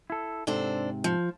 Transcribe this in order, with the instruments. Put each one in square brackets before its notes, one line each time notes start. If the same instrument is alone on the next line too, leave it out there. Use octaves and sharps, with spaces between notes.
[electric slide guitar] E4 A4
[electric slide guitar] G#2 C3 [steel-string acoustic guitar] D4 A4 C5
[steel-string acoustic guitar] F3